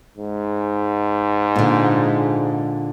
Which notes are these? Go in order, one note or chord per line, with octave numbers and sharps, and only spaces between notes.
G#2
A#2 D3